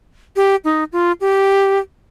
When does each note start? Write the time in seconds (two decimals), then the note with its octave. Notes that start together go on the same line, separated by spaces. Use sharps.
0.36 G4
0.64 D#4
0.93 F4
1.21 G4